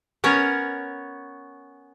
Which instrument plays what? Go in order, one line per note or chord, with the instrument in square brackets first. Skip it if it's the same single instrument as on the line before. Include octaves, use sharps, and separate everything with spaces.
[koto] B3 C#4 A#4 C#5